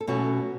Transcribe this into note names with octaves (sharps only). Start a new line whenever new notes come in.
A4
B2 F#3 A3 C#4 F#4